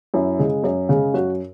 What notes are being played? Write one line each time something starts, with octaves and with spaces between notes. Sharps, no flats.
F#2 E4
C#3 G#3
F#2
C#3 G#3
F#2 F#4